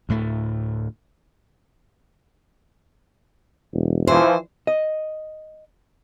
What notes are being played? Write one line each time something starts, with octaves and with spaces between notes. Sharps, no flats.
D2 A2 A3
E1
E3 F3 C5
D#5